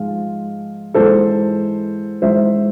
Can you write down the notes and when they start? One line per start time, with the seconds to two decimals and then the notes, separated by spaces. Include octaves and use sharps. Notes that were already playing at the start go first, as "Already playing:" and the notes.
Already playing: G#2 F3 G#3 F4
0.94 G#2 E3 G#3 A4 C5
2.22 G#2 E3 G#3 C5 E5